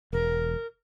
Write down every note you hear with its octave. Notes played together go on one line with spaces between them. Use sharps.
E1 A#4